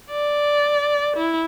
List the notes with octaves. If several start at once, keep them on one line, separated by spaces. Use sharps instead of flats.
D5
E4